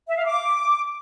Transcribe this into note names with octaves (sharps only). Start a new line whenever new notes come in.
E5
F5
D6